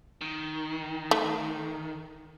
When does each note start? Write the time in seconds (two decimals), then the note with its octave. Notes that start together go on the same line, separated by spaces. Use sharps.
0.21 D#3
1.11 A3